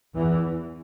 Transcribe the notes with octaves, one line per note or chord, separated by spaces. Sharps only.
E2 E3